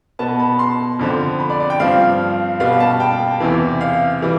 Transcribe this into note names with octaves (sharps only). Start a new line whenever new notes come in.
B2 B3 A5
B5
C6
F2 D3 F3 C4
B5
D5
D5
G5
G2 F3 C4 F5
B2 G3 B3 F5
A5
G5
E2 C3 E3
F5
E3 G3